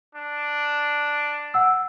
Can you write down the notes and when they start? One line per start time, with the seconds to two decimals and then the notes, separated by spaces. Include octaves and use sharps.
0.15 D4
1.54 F#5 E6